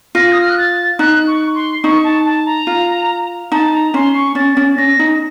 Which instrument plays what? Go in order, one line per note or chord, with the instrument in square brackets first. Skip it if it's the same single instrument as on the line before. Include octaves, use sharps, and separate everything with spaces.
[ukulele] F4 [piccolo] A#6
[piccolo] D#6
F6
F#6
A6
[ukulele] D#4 [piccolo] F#6
[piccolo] C#6
C6
[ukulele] D#4 [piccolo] C#6
[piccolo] A5
A5
A#5
[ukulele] F4
[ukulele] D#4 [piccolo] A5
[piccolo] A#5
[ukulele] C#4 [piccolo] C6
[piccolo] C#6
[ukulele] C#4 [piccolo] A6
[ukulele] C#4
[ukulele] C#4 [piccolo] A#6
[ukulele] D#4